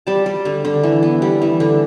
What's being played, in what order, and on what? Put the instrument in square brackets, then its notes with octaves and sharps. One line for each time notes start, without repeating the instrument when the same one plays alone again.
[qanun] G3 A5
G3
D3
D3
E3
B3
G3
E3
D3